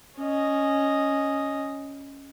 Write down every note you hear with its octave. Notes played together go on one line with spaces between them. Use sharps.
C#4 D#5